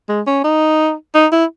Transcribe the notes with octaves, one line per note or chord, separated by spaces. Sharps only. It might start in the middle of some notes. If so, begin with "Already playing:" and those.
G#3
C#4
D#4
D#4
E4